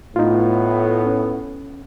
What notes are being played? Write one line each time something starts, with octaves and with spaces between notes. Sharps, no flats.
A2 B3 D#4 F4
C#4